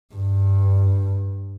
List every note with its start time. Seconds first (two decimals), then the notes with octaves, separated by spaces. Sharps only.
0.15 G2